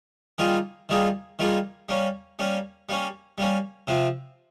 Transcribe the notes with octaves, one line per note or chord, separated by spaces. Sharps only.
D#3 G3 A#3 F4 G#4
D#3 G3 A#3 F4 G#4
D#3 G3 A#3 F4 G#4
G3 A#3 C#4
G3 A#3 C#4
G3 A#3 C#4
G3 A#3 C#4
C3 F3 C4